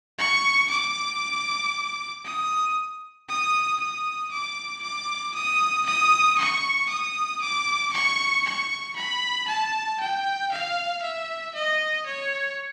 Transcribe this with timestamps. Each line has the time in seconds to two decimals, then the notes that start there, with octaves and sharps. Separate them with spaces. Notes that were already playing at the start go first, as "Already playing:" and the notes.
0.18 C#6
0.70 D6
2.25 D#6
3.29 D#6
3.80 D#6
4.31 D6
4.83 D6
5.35 D#6
5.86 D#6
6.38 C#6
6.90 D#6
7.41 D6
7.93 C#6
8.45 C#6
8.96 B5
9.48 A5
10.00 G5
10.52 F5
11.03 E5
11.54 D#5
12.06 C#5